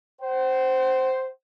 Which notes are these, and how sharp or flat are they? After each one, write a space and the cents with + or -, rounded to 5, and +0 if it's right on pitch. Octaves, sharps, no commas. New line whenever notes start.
C5 +0 F#5 +45